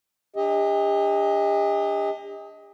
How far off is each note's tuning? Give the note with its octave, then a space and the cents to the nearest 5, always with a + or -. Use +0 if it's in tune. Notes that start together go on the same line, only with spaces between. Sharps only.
D4 -5 G4 +45 D#5 +30